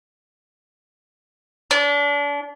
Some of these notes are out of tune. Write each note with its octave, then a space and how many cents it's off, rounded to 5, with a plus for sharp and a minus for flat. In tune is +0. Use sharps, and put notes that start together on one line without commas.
D4 -35